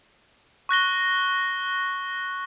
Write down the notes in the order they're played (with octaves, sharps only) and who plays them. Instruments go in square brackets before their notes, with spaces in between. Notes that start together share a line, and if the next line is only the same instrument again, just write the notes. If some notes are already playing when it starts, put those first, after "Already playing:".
[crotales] C#6 F#6 A#6 G7